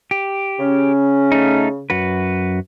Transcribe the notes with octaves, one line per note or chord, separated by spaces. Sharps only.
G4
C#3 C#4
A3 D#4
F#2 F#4 B4